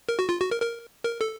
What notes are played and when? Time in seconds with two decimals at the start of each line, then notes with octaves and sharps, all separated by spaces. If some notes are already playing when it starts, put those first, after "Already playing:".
0.09 A#4
0.19 F#4
0.29 F4
0.41 F#4
0.51 A#4
0.62 A#4
1.04 A#4
1.21 A4